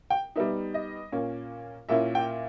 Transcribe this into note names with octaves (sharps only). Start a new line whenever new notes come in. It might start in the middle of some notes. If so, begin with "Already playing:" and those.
G5
G3 B3 D#4 E5
D#5
A#2 A#3 C#4
A#2 A#3 C#4 E4 E5
G5